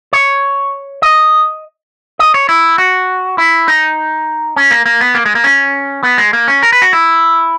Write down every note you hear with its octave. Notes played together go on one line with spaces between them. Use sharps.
C#5
D#5
D#5
C#5
E4
F#4
E4
D#4
C#4
A#3
A#3
B3
A#3
G#3
A#3
C#4
B3
G#3
A#3
C#4
A#4
B4
F#4
E4